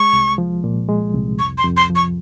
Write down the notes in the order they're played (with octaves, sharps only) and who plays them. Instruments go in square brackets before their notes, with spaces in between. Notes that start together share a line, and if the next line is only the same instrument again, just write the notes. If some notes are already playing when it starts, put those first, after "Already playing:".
Already playing: [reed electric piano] G#3 [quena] C#6
[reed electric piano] C2
F3
A#2
G#3
C2
[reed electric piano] F2 [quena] C#6
[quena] C6
[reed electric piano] F2
[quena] C6
[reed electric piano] F3
[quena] C#6